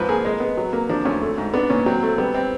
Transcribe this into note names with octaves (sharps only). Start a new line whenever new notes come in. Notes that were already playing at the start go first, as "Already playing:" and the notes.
Already playing: G#2 F3 B4
A#3 G#4
G#3
B3
F#3
A#3
F3 D4
D2 C#4
A3
G#2
B3 D4
A#2 C#4
F#3 C4
A3 C4
G3 B3
C4